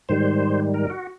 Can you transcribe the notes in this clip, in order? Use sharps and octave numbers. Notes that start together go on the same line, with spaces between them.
G#2 D#3 G3 C5
A#4
F#4